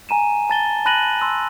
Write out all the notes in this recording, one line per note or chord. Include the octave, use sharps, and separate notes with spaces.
G#5 A#5 D#7 E7
A5 A6 G7
A5 B5 F#6 A#6 D#7 F#7
C6 E6